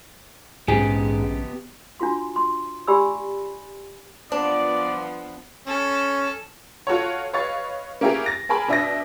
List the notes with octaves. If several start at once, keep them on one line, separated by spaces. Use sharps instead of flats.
A#1 G#2 C#3 B3 C#4 G4 G#4
D4 F4 F#4 C6
C6
G4 D5 G#5 B5 C6 E6
F3 B3 D4 D5
C#4 A4
F4 F#4 A4 C#5
B4 C#5 D#5 F5 C#6 A6
A#3 C#4 E4 G4 G#4 A#4
A6 A#6
G#4 A#4 G#5 A5 B5
B2 D4 E5 D#6 A#6